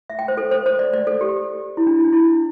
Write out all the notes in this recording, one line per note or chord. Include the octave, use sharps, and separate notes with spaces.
E5
G5
C5
A4
C5
C5
D5
D5
A4
G4
E4
D4
E4
D4
E4